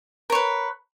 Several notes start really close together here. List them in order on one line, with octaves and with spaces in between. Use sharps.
A#4 C#5 B4